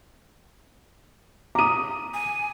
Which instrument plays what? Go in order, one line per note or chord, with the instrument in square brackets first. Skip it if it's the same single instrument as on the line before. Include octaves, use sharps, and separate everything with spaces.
[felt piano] A#5 D#6 [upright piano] D6 D#7
[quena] G#5